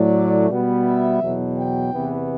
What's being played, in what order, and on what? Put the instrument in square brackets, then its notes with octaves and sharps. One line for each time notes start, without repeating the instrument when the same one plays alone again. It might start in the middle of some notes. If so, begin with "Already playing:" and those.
Already playing: [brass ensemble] A2 F#3 A3 D5
B2 G3 B3
E5
E2 B2 F#3
G5
E2 C3 E3 B3